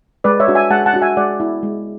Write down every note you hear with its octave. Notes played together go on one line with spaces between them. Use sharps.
G#3 B4 D5
C#5 E5
D4 F#4
E5 G#5
G#3 F#5 A5
F#5 A5
D4 F#4
E5 G#5
G#3 D5 F#5
B3 E4
G#3